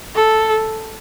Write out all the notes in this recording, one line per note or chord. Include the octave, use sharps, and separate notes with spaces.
A4